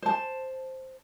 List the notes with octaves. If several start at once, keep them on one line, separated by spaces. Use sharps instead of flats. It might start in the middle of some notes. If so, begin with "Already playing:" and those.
C5 A5